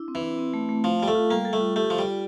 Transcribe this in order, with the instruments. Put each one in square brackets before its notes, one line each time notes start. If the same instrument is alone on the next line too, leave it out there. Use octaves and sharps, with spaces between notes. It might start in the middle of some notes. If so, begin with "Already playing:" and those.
Already playing: [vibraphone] D4 E4
C4
[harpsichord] E3
[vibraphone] E4
C4
A3
A3
[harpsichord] F3 [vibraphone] F5
[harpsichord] G3 [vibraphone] F5
[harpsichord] A3
[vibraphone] F4
[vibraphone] G3 [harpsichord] A#3
[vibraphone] A4
[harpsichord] A3
[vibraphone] F4
[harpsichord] A3 [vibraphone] G4
[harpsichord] F3 [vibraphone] G4
[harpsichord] G3
[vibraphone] D5